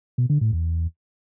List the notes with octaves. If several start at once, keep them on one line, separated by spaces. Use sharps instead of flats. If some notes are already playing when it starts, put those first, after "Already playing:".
B2
D3
A2
E2